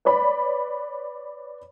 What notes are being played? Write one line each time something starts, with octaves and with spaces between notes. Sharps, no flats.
B4 C#5 D5 B5